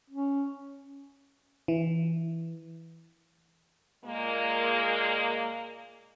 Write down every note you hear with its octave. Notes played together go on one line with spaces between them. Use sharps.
C#4
E3
A#2 G#3 A#3